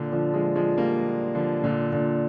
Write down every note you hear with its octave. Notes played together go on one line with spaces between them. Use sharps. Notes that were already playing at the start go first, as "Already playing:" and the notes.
Already playing: A#2 D3
D3 F3
F3 G#3
F3 G#3
G3 A#3
D3 F3
A#2 D3
A#2 D3